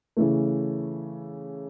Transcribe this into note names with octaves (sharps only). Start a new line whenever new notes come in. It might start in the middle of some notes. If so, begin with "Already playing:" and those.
C#3 E3 A3